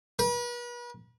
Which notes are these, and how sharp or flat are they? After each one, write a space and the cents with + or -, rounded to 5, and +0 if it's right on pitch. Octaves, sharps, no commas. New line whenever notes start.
B4 -40